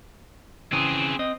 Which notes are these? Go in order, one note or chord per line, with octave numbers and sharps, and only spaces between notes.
C#3 E3 C4 G#4
C4 D#5